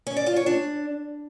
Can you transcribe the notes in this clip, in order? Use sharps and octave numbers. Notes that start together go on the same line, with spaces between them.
C#4
D5
F4
C#5
D4